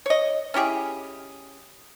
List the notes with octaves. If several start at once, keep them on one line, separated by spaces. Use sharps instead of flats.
C#5 D#5
C#4 E4 G4 G#4